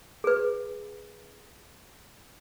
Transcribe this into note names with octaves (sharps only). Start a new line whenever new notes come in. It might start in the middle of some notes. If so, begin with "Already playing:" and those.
G#4 B4